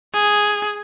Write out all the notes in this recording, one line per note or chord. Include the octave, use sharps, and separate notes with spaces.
G#4